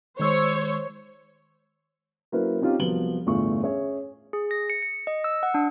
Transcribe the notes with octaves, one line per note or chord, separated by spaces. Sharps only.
D#3 G#3 C5 C#5 E6
F#3 A#3 C#4 E4 B4 C5
C4 C#4 D#4 F4 G4
C2 F3 F#3 B3 F#7 G7
G1 E2 A2 A3 F4 C#6
C#4 G#4 C#5 E5
G#4
A#6
C#7
C#7
D#5
E6
F#5
D4